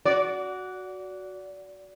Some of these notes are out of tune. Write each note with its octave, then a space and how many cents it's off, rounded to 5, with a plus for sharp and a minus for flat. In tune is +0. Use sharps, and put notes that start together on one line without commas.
F#4 +0 D5 -25